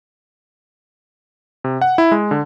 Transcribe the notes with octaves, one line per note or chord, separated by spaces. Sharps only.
C3
F#5
E4
G#3
D3